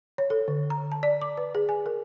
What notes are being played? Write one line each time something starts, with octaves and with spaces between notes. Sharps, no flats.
C#5
A4
D3
A#5
A5
D5
D6
B4
G#4
G#5
A#4